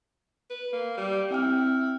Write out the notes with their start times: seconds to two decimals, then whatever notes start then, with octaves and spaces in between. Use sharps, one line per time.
0.50 B4
0.72 A#3
0.97 G3
1.31 C4 E4 G5 F6